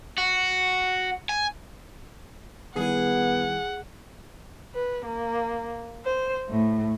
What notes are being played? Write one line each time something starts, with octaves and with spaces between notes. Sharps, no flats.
F#4
G#5
D#3 G3 B3 E4 G#4 F#5
B4
A#3
C5
A2